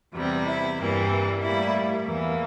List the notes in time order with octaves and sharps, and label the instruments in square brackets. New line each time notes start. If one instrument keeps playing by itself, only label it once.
[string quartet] E2 C3 G3
E4
G2 E3 G3 A#3
A2 G3 A#3 E4
E2 E3 A#3